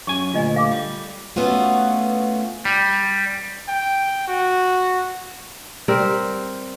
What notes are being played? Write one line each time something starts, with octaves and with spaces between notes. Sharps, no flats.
F#2 C#4 G#5 C#6
D2 A#2 F4 D#5 G#5
A4 F5 D6
G3
A3 B3 C#4 F4 F#4
G3
G5
F#4
G3 C4 A#4